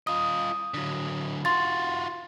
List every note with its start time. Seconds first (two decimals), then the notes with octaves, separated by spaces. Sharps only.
0.07 F4 D#5 D#6
0.74 D3 F#3
1.45 F4 F#4 C6 A6